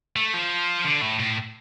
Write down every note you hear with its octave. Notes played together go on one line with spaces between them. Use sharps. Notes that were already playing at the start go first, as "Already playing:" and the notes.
A3
F3
D3
A2
A2